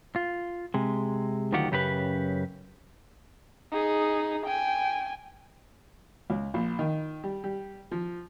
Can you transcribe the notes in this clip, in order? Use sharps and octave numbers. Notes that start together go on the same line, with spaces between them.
F4
C3 G#3
D2 D#3 F#3 F4 G4 F#5
F#2 C#3 G4 A#4 B4
D#4 G#4
G5 G#5
C#2
A#1
D#3
G3
G3
F3